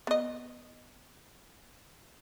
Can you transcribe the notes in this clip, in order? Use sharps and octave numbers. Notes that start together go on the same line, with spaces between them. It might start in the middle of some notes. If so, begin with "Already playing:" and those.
B3 D#5